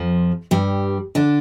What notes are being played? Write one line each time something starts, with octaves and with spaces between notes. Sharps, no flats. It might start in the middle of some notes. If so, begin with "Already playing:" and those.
Already playing: F2 F3
G2 G3
D3 D4